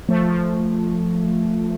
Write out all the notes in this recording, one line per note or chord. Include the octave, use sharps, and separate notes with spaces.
F3 A3
F3